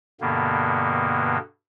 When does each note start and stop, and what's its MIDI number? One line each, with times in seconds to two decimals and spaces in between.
0.21 1.38 43
0.21 1.38 47
0.21 1.38 50
0.21 1.38 58
0.21 1.38 59